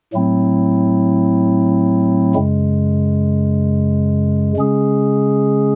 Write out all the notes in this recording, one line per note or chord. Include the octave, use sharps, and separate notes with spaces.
A2 F#3 A3 C4 E4
F#2 C#3 G#3
C#3 G#3 C#4 G#4